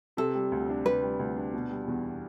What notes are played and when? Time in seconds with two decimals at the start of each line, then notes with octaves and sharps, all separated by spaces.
0.17 C3 A4
0.35 G3
0.52 D2
0.69 D4
0.86 C3 B4
1.03 G3
1.19 D2
1.36 D4
1.54 B2
1.70 G3
1.87 E2